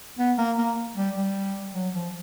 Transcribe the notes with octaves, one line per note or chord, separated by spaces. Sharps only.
B3
A#3
A#3
G3
G3
F#3
F3